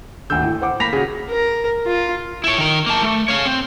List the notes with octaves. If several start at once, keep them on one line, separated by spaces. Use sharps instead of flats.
D#1 D2 D3 E6 G6
A2
C5 F#5 D6
A#3 B5 A#6 B6 F7
C#3 F#4 G#4
A#4
F4
E4 C#5
D#3 A#4
A#3 A5
A3
C#5 F5
C4